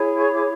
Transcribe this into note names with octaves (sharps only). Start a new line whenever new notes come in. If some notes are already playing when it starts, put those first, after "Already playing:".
Already playing: E4 G#4 C#5
C#6
D6